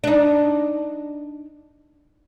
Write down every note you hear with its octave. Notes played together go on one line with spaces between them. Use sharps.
D4 D#4